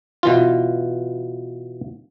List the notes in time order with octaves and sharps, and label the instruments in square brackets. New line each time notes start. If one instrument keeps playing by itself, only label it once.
[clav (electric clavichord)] B2 E3 F4